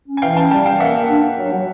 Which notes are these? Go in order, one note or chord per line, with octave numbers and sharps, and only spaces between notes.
C#4
G#5
E3 F5 G5
C#4 G5 A5
G3 G5 A5
E3 F5 G5
A#3 E5 F#5
A#3
D4
D4
F#3
F#3